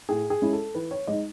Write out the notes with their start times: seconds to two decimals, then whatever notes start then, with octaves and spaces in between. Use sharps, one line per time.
0.09 A2 G#4
0.30 G#4
0.42 G#3 C#4 E4
0.53 A4
0.75 E3 B4
0.91 C#5
1.07 G#3 D#4 D#5